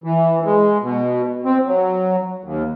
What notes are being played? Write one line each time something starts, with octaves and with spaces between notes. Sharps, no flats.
E3
G#3
B2
C4
F#3
D#2